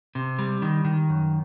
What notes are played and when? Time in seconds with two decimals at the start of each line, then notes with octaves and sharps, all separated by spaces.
0.15 C3
0.39 G3
0.62 D#3
0.85 D#3
1.09 F#2